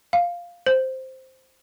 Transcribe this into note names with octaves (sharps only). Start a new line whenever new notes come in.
F5
C5